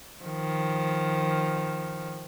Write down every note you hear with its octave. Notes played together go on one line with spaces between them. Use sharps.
D#3 F3